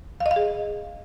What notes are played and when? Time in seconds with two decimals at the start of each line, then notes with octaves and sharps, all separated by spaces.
0.20 F5
0.26 D#5
0.31 F5
0.36 G#4